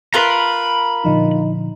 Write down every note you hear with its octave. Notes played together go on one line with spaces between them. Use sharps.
F4 A#4 B4 A#5 B5
A#2 D3 F3 D#4